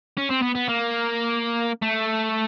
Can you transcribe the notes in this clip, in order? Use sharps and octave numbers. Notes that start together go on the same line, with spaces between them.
C#4
C4
B3
B3
A#3
A3